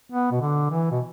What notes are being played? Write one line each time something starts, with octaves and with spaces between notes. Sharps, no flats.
B3
B2
D3
E3
B2